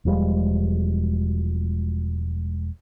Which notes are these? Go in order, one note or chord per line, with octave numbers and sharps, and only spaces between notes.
E1 F3 G3 G#3